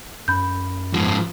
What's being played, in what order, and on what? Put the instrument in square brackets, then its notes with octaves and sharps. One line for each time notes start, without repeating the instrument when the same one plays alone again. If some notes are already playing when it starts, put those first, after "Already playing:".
[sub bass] F#2 [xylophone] B5 G6
[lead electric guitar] G#2 F3